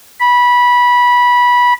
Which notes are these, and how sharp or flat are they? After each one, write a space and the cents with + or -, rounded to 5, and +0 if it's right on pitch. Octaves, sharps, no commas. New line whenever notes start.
B5 -15